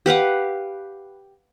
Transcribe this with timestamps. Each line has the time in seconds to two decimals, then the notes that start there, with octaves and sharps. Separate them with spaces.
0.06 G4 B4 F5 F#5